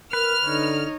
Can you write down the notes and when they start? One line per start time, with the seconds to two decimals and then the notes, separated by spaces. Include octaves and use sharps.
0.13 A#4 B4 F6
0.45 D3 D#4 C#5